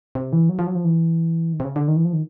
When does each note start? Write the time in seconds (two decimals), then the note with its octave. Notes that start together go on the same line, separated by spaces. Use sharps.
0.15 C3
0.33 E3
0.49 F#3
0.59 F3
0.67 F#3
0.75 F3
0.84 E3
1.53 D#3
1.60 C3
1.65 C#3
1.76 D3
1.88 D#3
1.96 E3
2.05 F3
2.13 D#3